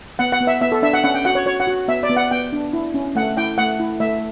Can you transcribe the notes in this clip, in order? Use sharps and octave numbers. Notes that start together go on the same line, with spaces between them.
B3 F#5
F#5
B3
E5
B3 E5
A4
D4 E5
F#5
C#4 F#5
G5
F#4 F#5
C#5
F#4 C#5
F#5
F#4
B3 E5
D5
B3
F#5
B3 G5
D4
E4
C#4
A3 F#5
E4 G5
A3 F#5
E4
A3 E5